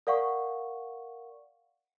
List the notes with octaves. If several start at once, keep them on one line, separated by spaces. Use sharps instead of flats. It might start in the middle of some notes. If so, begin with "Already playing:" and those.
A#4 D5 F5 F#5 C#6